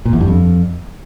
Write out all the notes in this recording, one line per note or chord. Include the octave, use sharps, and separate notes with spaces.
A#2
E2
G2
F2